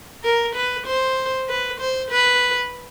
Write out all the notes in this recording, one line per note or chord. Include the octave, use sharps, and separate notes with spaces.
A#4
B4
C5
B4
C5
B4